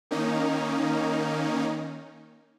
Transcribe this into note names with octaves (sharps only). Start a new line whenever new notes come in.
D#3 A#3 C#4 D#4